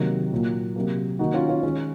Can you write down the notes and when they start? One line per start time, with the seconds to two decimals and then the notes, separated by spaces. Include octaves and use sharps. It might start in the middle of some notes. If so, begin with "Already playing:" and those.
Already playing: C3 D#3 F#3 A#3
0.32 A#2 F#3 A#3
0.76 C3 F#3 A#3
1.19 D#3 A#3 D#4 F#4
1.34 C#4 F4
1.49 C#4 F4
1.63 D#3 G#3 C#4